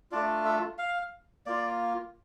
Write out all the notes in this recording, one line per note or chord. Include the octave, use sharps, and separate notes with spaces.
A3 D4 F4 D5
E5
F5
A#3 F4 D5